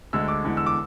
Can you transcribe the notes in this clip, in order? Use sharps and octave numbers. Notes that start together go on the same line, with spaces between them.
D2 D3 G#3 E6
D6
E2 D3 G#3
E6
D6